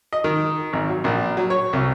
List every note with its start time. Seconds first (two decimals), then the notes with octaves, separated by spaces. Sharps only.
0.13 D#5
0.24 D#3
0.73 G#1
0.89 F#3
1.04 A#1
1.37 F#3
1.50 C#5
1.73 C2